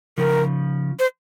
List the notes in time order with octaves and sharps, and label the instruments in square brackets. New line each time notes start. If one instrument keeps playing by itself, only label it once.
[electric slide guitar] C#3 F3 [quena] A#4
[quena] C5